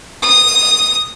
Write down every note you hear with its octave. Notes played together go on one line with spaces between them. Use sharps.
D#6